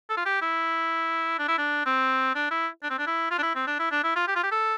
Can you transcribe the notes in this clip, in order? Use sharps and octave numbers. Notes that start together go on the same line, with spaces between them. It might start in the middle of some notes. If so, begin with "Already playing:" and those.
A4
F4
G4
E4
D4
E4
D4
C4
D4
E4
D4
C4
D4
E4
F4
D4
E4
C4
D4
E4
D4
E4
F4
G4
F4
G4
A4